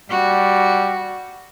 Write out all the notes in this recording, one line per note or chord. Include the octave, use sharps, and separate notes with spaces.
G3 F#4